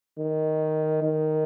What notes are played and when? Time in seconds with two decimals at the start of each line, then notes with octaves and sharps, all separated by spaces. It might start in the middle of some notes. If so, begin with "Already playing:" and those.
0.18 D#3
1.02 D#3